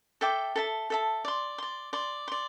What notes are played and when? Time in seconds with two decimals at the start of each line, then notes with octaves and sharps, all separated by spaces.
0.21 A4 E5 G5 D6
0.56 A4 E5 A5
0.90 A4 E5 A5
1.25 D5 C6
1.58 D5 C6
1.93 D5 C6
2.28 D5 C6